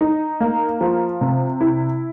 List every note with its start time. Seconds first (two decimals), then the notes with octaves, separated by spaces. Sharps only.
0.01 D#4
0.40 A#3
0.81 F3
1.21 C3
1.61 E4